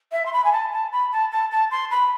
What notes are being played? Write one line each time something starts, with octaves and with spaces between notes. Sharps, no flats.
E5
C6
B5
G#5
A5
A5
B5
A5
A5
A5
C6
B5